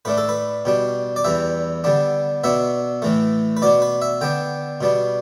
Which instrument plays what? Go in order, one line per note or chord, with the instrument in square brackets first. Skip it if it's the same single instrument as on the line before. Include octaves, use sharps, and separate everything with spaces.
[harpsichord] A2 A3 D4 B4
A4
B4
B2 G3 D4
D5
E2 E3 G3 E5
D3 G3 B3 D4
B2 B3 D4 E5
A2 E3 A3
B4
B2 B3 D4 D5
B4
E5
D3 B3 D4 G5
B2 G3 B3 D4